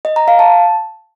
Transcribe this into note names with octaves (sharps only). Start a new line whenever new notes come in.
D#5
A#5
F5
A5